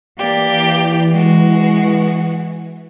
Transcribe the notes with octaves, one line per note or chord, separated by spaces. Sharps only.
E3 A#3 G4 D5
G#3 F#4